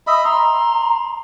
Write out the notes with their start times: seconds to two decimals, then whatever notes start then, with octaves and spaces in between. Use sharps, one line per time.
0.07 D#5 E5 B5
0.25 A#5 C6